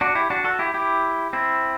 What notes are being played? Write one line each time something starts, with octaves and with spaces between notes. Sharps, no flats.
D4 F#4
E4 G4
D4 F#4
F#4 A4
E4 G4
E4 G4
C4 E4